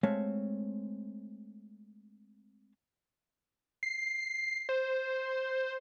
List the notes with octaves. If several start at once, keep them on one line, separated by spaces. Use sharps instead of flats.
G#3 A3 C4 C#5 F5
C7
C5